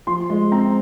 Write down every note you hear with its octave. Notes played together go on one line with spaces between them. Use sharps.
F3 C6
G#3
C4 A#5